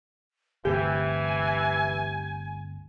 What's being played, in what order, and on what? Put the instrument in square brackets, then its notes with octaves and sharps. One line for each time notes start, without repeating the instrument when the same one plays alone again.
[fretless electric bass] G1 D2 C3 [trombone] E3 [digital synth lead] G4 [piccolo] G#5